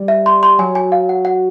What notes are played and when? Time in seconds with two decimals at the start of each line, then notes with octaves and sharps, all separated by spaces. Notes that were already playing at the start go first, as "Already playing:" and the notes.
Already playing: G3
0.08 E5
0.26 C6
0.43 C6
0.59 F#3 G#5
0.75 G#5
0.92 F5
1.09 F#5
1.25 F#5